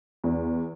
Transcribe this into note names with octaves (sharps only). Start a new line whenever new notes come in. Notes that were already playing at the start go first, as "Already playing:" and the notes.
E2